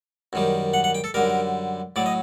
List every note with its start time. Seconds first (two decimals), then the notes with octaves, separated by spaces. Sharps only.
0.33 F#2 D#3 G3
0.74 F#5
0.84 F#5
0.95 G5
1.04 A4
1.14 F#2 D3 G3 A#4
1.96 A2 F#3 D5
2.06 D#5